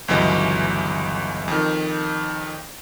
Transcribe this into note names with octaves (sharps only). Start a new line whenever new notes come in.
G1 C#2 E3 F#3 D#5
F2 D#3